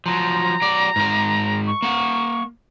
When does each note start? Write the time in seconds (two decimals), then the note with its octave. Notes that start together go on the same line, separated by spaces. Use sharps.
0.06 F3 F#3 A#5
0.62 F#3 D5
0.96 G#2 A#4
1.67 C#6
1.82 A#3 F#5